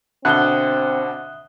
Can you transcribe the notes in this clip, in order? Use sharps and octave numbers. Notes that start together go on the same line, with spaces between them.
B2 D3 C4 E5 D#6 F#6 G7